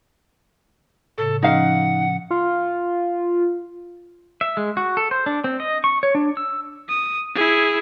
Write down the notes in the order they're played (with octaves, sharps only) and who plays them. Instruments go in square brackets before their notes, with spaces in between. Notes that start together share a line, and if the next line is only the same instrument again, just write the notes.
[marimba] A2 C#3 [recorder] A4
[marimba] F3 C#4 [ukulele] D#4 F5 [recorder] F#5
[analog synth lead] F4
[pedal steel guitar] E5
G#3
F#4
A4
C5
D4
C4
D#5
C#6
C#5
D4
E6
[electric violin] D#6
E4 G#4